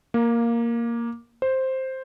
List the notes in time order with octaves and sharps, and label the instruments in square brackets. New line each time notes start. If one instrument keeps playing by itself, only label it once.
[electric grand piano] A#3
C5